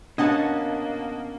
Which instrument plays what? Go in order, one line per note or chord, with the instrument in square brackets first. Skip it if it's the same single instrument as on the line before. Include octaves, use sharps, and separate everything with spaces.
[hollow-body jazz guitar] B2 C#4 [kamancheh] A#3 [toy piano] D4 [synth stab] D#5 F#5 A5